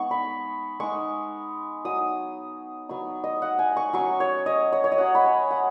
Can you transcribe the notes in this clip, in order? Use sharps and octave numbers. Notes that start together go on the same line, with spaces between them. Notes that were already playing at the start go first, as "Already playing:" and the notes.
Already playing: G#3 B3 D#4 C#6
B5
G#3 D#4 C#6
F#3 D#4 D#6
F#3 B3 D#4 C#6
D#5
F#5
G#5
C#6
F#3 C#4 C#6
C#5
D#5
C#5
C#5
D#5
F#3 C#4 F#5
B5
G#5
F#5